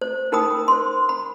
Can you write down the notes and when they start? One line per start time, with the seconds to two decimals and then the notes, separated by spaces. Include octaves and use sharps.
0.01 C5
0.32 D#4 A#4 G5 B5 D#6
0.68 C5 C6
1.09 B5